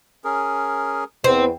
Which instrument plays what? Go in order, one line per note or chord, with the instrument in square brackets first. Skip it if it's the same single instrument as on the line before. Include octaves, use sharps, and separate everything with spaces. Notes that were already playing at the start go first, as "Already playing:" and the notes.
[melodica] C#4 G#4 A#4
[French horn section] E2 B4 [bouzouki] C4